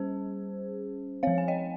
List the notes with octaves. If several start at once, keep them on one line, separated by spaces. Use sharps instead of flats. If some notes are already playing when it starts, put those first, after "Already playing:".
Already playing: G3 C#4 G#4 C5
F3 C4 C#5 F5
G#5
D#5 G5